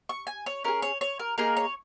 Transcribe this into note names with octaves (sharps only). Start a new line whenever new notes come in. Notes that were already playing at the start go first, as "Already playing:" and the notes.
C#6
G#5
C#5
C#4 G#4 A#4
C#5
C#5
A#4
A#3 D#4 G#4 A#4
C#5